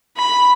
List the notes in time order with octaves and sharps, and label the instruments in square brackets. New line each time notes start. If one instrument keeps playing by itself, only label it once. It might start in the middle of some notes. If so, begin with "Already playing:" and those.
[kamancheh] B5